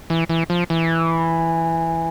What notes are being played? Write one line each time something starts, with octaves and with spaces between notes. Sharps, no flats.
E3
E3
F3
E3